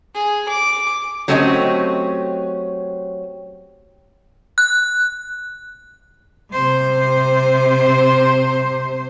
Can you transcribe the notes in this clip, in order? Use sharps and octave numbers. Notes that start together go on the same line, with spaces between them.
G#4
D6
F#3 A3 C4 C#4 G4 D#5
F#6
C3 C5